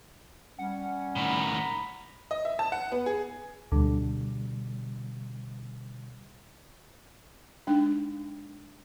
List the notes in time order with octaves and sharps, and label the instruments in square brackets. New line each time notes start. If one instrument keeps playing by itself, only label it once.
[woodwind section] G3 C#4 [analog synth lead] F#5
[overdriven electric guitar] A2 D#3 [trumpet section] A#5 B5
[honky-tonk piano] D#5
E5
A5
F#5
B3
G#4
[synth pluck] D2 [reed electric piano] B2 D3 G3
[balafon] G#3 D4 D#4 G5